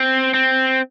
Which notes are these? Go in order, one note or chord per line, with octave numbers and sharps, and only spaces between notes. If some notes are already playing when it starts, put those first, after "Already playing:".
Already playing: C4
C4